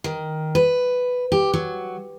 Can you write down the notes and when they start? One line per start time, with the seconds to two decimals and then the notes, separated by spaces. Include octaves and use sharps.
0.04 D#3
0.55 B4
1.32 G4
1.54 F#3